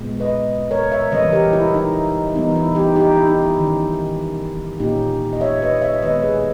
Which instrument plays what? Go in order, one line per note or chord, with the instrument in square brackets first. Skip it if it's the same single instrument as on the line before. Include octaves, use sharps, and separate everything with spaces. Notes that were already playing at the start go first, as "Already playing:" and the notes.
Already playing: [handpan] A#2 G#3 B3
B4 D#5
A#4 C#5
C#5 E5
C#3 E3 G3 C#4 B4 D#5
G4 A#4
E4
D#4
E3 G3 B3 D#4
E4
D#4 G4
D#4 G4
E4
D#4
E4
D#3 G3 C#4
A#2 A#3 C#4 D#4 G4
D#5
C#5 E5
B4 D#5
C#5 E5
D#3 G#3 B3 B4 D#5
G#4 B4